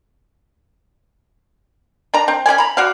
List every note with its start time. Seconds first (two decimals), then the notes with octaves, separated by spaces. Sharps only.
2.14 D4 A#5
2.28 C4
2.46 C#4 G#4 D5 G#5
2.58 A#5 B5
2.77 F#4 D5 F5